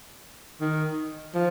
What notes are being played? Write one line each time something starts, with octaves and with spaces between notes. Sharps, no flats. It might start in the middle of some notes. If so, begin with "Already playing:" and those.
D#3
F3